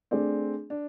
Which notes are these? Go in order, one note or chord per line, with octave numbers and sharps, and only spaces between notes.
A3 C4 D4 G#4 D5
D4